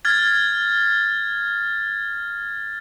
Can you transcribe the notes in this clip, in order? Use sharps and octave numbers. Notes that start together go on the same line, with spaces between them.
F6 G#6 A6